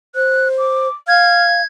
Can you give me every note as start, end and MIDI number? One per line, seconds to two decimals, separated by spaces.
0.15 0.88 72
0.15 0.48 90
0.58 0.92 86
1.08 1.61 77
1.08 1.44 89
1.08 1.65 92